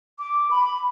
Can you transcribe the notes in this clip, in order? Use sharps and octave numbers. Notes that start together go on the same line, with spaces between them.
D6
B5